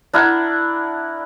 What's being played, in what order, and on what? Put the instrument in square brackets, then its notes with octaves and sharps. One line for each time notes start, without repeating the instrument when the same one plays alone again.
[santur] D4 E4 A#4 F#5